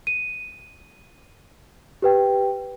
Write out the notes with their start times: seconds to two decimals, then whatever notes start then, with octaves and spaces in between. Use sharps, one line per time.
0.07 D#7
2.02 G4 B4 G5